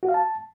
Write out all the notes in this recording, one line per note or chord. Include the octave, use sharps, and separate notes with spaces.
F#4
F5
A5